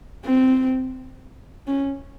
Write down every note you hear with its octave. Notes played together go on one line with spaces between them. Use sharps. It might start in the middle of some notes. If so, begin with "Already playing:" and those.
C4
C#4